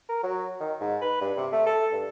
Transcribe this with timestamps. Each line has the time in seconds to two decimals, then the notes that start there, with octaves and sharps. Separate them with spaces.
0.09 A#4
0.24 F#3
0.60 D#3
0.81 G#2
1.01 B4
1.21 G2
1.37 C3
1.52 A3
1.66 A4
1.92 G2